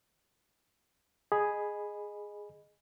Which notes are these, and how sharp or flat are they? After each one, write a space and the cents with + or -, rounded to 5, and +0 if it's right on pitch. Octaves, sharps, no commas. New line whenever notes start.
G#4 +0 D#5 -15 B5 +0